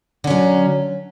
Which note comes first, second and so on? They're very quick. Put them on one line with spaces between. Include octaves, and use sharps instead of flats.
D3 C#4 F#3